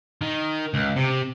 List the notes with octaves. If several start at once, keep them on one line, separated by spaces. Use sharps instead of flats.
D#3
C#2
C3